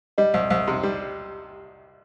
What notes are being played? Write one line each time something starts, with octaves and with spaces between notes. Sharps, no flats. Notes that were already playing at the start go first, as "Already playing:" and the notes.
G3 D#5
C2
C2
C3
G3